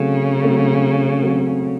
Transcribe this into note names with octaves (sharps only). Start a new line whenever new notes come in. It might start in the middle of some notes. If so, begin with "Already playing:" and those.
Already playing: C#3 F#3 A3 C4
F#3 A3 C4
F#3 A3 C4